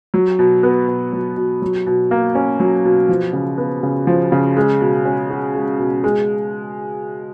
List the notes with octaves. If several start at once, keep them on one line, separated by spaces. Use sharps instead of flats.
F#3
B2
B3
B2
F#3
B2
F#3
B2
A#3
C#4
F#3
B2
F3
C#3
B3
C#3
F3
C#3
G#3
B2
C#4
F#4
G#3
B2
G#3